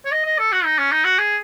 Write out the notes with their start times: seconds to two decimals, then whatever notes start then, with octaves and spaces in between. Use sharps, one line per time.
0.05 C#5
0.12 D#5
0.25 D#5
0.39 A4
0.52 F#4
0.65 D#4
0.78 C#4
0.92 D#4
1.05 F#4
1.19 G#4